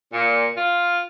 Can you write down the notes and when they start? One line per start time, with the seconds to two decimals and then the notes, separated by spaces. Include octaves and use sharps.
0.13 A#2
0.56 F4